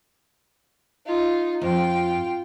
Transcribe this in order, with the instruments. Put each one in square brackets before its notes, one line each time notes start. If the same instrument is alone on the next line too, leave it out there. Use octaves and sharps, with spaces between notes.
[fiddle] D#4 F4
[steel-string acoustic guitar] F2 [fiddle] F4 G5